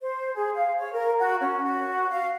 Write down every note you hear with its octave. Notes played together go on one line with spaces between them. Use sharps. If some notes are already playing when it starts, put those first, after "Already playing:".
C5
G#4
F5
C#5
A#4
F#4
C#4
F#4
F5